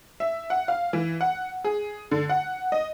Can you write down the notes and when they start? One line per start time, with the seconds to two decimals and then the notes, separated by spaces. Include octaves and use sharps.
0.20 E5
0.50 F#5
0.68 F5
0.93 E3
1.21 F#5
1.64 G#4
2.11 D3
2.29 F#5
2.72 D#5